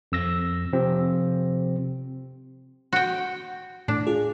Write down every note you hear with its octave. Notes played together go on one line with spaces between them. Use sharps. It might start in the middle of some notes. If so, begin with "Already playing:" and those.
F2 E6 A#6
C3 F3 C4
F#4 G5
A2 D4
F4 G#4